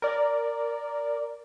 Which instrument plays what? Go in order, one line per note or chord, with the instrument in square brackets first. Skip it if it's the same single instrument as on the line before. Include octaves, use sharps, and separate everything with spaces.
[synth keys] A#4 D5